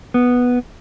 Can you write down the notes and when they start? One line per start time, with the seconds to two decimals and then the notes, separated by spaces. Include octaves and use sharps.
0.14 B3